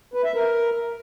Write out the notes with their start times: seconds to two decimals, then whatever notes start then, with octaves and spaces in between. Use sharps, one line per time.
0.14 B4
0.24 E5
0.35 A#4